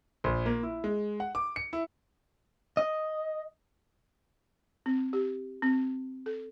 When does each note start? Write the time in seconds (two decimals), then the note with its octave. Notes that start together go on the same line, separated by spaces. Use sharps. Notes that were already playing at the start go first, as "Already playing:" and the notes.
0.24 A#1
0.46 A#3
0.63 E4
0.84 G#3
1.20 F#5
1.35 D6
1.56 C#7
1.73 E4
2.77 D#5
4.86 C4
5.13 G4
5.62 C4
6.26 A4